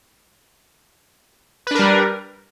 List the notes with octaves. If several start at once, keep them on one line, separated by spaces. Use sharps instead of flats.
G3 D4 A#4 B4